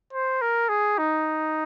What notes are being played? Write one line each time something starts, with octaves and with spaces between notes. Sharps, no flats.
C5
A#4
G#4
D#4